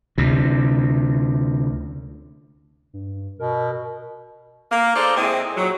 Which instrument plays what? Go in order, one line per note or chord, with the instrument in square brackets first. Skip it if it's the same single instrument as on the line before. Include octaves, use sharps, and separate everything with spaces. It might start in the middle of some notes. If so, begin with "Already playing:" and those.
[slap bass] D2 C3
[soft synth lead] G2
[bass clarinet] B2 [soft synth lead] A#4
[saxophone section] A#3
D#4 G#4 A4 C5 D5
A#2 G#3 C4 E4 G#4
A#2 F#3